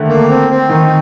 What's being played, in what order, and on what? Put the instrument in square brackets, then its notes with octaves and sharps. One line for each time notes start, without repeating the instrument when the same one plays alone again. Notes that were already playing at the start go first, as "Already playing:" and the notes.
Already playing: [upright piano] D3 D#3 A3
[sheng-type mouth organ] A#3
C4
C4
[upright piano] D#3 [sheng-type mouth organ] D#4